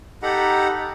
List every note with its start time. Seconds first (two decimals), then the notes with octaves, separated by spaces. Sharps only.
0.22 D#4 G4 A4 F#5 A#5 B5